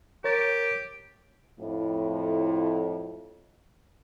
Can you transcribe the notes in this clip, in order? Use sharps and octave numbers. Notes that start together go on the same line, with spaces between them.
G4 A#4 C#5 A6
F2 A2